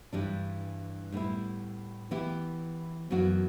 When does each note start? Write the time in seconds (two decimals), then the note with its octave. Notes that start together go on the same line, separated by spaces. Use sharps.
0.13 G2 E3 G3 D4
1.12 A2 G3 B3 E4
2.11 E3 B3 E4 G4
3.10 F#2 E3 B3 D4 F#4